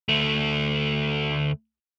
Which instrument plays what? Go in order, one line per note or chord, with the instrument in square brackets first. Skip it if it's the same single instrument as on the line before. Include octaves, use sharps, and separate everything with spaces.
[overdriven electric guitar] D2 A3